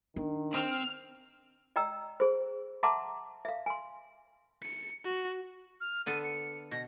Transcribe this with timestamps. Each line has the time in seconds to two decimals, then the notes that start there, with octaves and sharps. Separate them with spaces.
0.16 D#3 D4
0.54 C4 F6
1.76 D5 D#5 G5 A#5 E6
2.20 G#4 C5
2.83 E5 F#5 A5 A#5 C6 D6
3.45 E5 F5
3.66 G#5 C6
4.63 C#7
5.05 F#4
5.81 F6
6.06 D3 B3 A4 D#7
6.24 C#7
6.71 B2 A#6